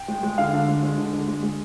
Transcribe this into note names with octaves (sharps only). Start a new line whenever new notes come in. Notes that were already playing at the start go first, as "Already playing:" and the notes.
Already playing: G5
G#3
G#3
D3 F5
D3
G#3
G#3
D3
D3
G#3
G#3